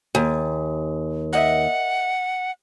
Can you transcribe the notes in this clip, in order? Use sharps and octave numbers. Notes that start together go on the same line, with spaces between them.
D#2 G#5
A#4 D#5 E5 F#5